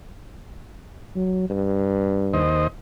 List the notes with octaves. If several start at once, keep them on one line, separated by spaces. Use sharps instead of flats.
F#3
G2
D#2 C5 D#5